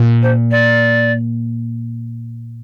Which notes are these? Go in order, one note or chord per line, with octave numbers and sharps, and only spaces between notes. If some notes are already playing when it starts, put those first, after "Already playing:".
Already playing: A#2
C5
D5